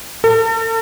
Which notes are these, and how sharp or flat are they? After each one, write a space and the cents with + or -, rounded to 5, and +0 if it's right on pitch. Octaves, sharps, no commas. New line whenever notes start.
A4 +45